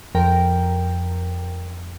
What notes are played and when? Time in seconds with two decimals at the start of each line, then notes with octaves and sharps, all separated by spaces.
0.15 F2 F3 A#4 G5